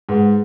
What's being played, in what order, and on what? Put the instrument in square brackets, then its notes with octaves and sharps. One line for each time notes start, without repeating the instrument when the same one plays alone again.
[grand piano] G#2 [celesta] G#4 B4 F#5